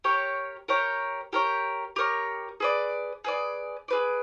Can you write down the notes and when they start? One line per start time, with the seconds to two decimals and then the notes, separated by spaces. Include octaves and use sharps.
0.04 G4 A#4 C#5
0.68 G4 A#4 C#5
1.33 G4 A#4 C#5
1.96 G4 A#4 C#5
2.60 G#4 B4 D5
3.24 G#4 B4 D5
3.88 G#4 B4 D5